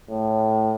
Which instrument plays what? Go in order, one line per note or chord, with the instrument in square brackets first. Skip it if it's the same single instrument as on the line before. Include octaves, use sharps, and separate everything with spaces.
[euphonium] A2